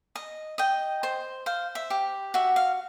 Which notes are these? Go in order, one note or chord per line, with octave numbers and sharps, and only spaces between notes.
D#5
D#5 G5
C5
C5 F5
E5
G4
F#4 E5
F5